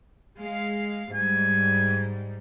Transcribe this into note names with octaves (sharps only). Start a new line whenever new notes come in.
G#3 F5
G#2 G3 G#3 G#5